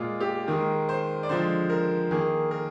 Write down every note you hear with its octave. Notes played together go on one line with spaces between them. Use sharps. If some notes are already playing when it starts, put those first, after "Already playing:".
Already playing: A#2 G#3 F4
G4
D#3 G#3 A#4
C5
D5
D3 F3 G#3 C5
A#4
D#3 A#3 G#4
A#4